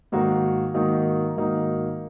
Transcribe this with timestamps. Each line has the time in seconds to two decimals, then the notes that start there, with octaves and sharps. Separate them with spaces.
0.12 G#2 D#3 A#3 D#4 F#4
0.74 G#2 D#3 A#3 D#4 F#4
1.36 G#2 D#3 A#3 D#4 F#4